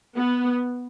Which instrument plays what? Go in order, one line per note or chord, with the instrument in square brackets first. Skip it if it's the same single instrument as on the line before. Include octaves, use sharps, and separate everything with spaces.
[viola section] B3